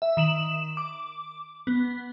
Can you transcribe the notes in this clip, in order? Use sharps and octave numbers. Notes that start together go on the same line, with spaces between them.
E5
D#3 E7 F#7
D6
B3